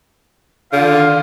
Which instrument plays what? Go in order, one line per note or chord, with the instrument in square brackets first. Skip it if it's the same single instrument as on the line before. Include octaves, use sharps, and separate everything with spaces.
[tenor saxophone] D3 [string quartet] D#3 F4 [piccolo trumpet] F5